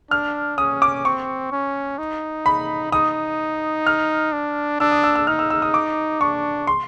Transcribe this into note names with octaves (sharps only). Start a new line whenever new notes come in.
D4 F6
C#4 D#6
D6
C4 C#6
C#4
D#4
B5
D#4 D#6
F6
D4
D4 E6
D#6
E6
E6
D#4 F6
E6
E6
D#6
D6
D4 C#6
C6